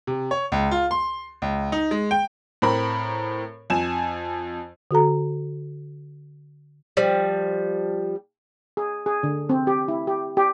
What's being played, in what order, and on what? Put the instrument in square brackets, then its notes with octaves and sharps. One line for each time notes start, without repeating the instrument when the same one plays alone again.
[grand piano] C3
C#5
C#2
F4
C6
C#2
D#4
G#3
G5
[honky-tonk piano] A2 C4 A#4 B5
F2 G#5 E7
[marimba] D3 F#4 A4 A#5
[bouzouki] F3 G3
[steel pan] G#4
G#4
D3
C4
G4
E4
G4
G4